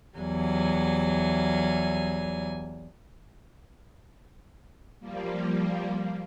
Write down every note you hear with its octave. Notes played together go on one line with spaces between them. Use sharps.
E2 F#3 G3 G#5
F3 G3 A#3